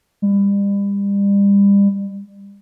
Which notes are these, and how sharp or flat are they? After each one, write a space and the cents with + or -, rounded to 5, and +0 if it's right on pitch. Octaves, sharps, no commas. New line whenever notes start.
G3 +35